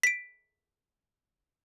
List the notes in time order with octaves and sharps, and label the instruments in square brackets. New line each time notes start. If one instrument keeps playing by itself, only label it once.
[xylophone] B6 D7